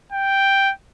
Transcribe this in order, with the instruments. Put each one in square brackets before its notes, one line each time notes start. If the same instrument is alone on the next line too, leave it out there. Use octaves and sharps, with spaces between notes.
[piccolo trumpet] G5